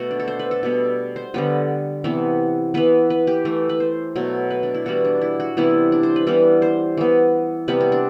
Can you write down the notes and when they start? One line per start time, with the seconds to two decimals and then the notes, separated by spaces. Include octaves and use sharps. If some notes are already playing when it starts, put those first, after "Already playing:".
Already playing: B2 A3 F#4
0.11 D4
0.20 A4
0.28 C5
0.39 B4
0.51 A4
0.63 B2 G3 B3
1.16 C5
1.34 D3 G3 B3 B4
2.04 C3 E3 B3
2.74 E3 B3 B4
3.10 B4
3.27 G4
3.45 E3 A3
3.69 B4
3.80 C5
4.16 B2 F#3 A3
4.50 B4
4.63 D4
4.74 E4
4.86 E3 G3 B3 F#4
5.05 D4
5.21 E4
5.40 F#4
5.57 C3 E3 G3 B3 E4
5.92 D4
6.03 C5
6.16 B4
6.27 E3 G3 B3
6.62 C5
6.97 E3 B3
7.68 C3 G3 B3 B4
7.81 C4
7.92 D4